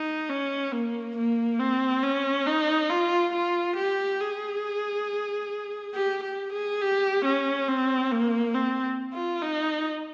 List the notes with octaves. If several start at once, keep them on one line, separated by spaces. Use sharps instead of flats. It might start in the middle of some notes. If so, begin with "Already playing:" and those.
Already playing: D#4
C#4
A#3
A#3
C4
C#4
D#4
F4
F4
G4
G#4
G4
G4
G#4
G4
C#4
C4
A#3
C4
F4
D#4